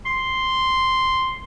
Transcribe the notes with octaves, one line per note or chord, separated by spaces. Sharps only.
C6